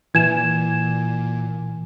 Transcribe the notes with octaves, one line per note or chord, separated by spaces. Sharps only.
A#2 E3 G#5 G#6 E7